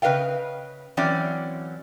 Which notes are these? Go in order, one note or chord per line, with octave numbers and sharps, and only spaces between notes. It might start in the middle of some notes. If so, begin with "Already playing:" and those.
C#3 B4 D#5 F5 G5
E3 F#3 C4 C#4 D5